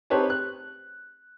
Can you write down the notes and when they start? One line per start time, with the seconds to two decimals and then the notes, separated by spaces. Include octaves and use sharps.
0.10 C4 D#4 G4 B4 C#5 A5
0.30 F#6